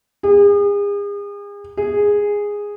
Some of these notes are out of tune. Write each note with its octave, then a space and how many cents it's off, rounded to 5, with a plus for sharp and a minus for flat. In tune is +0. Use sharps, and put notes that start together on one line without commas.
G#4 -40
G#4 -10